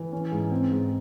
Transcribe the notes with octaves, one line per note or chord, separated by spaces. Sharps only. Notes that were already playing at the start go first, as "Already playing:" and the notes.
Already playing: E3
C#4
G#2
C4
G#2